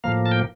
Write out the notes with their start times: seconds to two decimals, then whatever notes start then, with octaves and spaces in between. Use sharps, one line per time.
0.04 A2 F3 A#3 F5
0.26 A5
0.31 G5